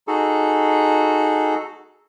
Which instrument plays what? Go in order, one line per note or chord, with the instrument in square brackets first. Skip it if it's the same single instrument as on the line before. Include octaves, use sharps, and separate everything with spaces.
[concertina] D#4 F#4 G#4 A4